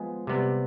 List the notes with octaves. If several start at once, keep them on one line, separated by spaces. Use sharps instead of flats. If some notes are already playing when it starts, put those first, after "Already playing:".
Already playing: F3 G#3 B3
C3 G3 B3